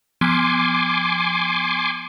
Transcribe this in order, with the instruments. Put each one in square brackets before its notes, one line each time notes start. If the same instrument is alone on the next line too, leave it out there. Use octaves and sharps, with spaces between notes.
[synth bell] F3 B3 G#6 [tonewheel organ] G#5 C6 D6